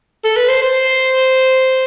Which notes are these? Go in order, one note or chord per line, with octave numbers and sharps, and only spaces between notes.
A4
B4
C5
C5